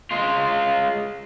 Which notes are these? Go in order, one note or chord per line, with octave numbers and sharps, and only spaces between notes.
G#3 F4